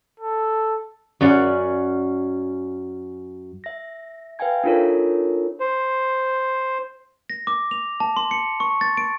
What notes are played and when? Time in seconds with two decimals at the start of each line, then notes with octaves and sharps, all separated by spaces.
0.20 A4
1.21 F#2 C#4 D5 F#5
3.64 E5 A#6
4.39 B4 E5 F5 G5 G#5 G#6
4.64 D4 D#4 F4 A4 A#4 C#5
5.60 C5
7.30 A#6
7.47 D6
7.71 F7
8.00 A5
8.17 C6
8.31 C#7
8.60 C#6
8.81 A6
8.97 D7